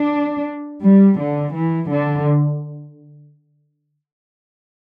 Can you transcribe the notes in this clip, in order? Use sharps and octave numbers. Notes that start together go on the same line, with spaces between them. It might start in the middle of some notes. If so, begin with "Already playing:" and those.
Already playing: D4
G3
D3
E3
D3